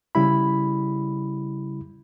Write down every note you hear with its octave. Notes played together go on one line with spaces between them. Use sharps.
C#3 G3 E4 B5